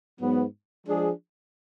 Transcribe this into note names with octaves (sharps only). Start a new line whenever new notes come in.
G#2 F#3 B3
F3 G#3 D4 G#4